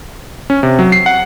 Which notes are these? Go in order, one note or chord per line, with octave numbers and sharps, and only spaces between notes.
C#4
C3
F#3
C7
F#5